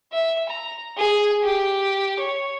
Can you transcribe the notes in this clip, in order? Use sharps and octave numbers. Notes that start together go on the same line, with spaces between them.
E5
A#5
G#4
G4
C#5